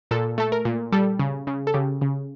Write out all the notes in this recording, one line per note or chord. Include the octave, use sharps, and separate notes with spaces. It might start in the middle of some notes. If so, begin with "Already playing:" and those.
A#2 A4
A3 A4
A#4
A#2
G3 A4
C#3
C#3
A4
C#3 G4
C#3